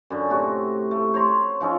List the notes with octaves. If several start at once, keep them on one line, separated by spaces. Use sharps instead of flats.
F#2 D3
A2 C3 F#4
A3
C5 C#5 A#5 C6
F3 C#4 D#4 A4